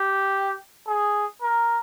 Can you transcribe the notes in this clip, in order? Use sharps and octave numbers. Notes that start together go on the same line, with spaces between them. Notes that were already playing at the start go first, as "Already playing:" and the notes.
Already playing: G4
G#4
A#4